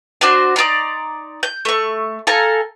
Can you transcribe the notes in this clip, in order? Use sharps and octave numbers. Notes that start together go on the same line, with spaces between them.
D4 F#4 C5 C6
D#4 D5 A#5 C6
G6
A3 C#6
A4 F5 G#5 A#5